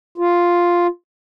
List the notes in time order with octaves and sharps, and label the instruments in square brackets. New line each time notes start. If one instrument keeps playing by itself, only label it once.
[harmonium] F4